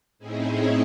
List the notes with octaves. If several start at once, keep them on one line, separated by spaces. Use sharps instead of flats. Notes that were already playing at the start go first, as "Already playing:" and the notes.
A2 C4 C#4 D#4 E4 G#4